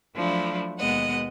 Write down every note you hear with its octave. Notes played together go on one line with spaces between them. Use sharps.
F3 F#3 A3 D4 E4
D#2 B2 G#3 B3 D#5 F#5